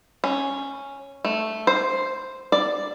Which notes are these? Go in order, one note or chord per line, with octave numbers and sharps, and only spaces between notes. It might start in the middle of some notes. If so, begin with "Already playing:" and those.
C#4
A3
C5
D5